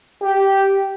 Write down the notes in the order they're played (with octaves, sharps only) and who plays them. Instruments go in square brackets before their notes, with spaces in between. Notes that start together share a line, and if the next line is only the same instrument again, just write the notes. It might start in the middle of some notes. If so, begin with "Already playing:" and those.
[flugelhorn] G4